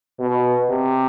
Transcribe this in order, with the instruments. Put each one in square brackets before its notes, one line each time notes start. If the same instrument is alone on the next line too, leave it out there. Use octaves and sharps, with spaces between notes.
[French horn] B2
C3